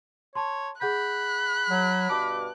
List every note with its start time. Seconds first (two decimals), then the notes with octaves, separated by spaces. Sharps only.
0.35 C#5 A5 C6
0.81 G#4 F#5 B5 F#6 G6
1.69 F#3
2.10 G2 B2 A5 D6